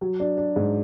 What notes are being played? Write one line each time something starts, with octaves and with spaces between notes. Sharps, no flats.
F#3
D4
D4
G#2